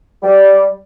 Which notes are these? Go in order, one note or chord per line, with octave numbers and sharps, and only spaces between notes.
G3